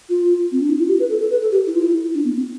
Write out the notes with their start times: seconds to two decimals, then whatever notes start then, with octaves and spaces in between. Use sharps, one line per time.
0.10 F4
0.52 C4
0.61 D4
0.70 E4
0.80 F4
0.89 G4
1.00 B4
1.09 A4
1.21 A4
1.31 B4
1.41 A4
1.52 G4
1.67 E4
1.75 F4
1.82 E4
2.15 D4
2.25 B3
2.36 C4